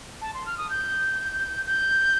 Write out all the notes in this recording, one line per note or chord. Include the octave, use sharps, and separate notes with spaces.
A5
C6
F6
D#6
G6
G6